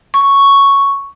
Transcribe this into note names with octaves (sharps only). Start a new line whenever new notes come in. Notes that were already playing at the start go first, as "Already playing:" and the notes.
C#6